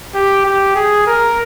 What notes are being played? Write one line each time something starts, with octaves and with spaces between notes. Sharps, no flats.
G4
G4
G#4
A#4